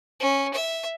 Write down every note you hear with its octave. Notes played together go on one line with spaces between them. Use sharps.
C#4
E5